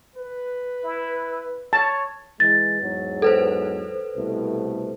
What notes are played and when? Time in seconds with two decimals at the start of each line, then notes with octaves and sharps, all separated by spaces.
0.16 B4
0.84 E4
1.73 C#5 A5
2.40 E3 G#3 A6
2.82 E2 G#2 F#3
3.22 A4 B4 C5
4.17 C2 B2 A3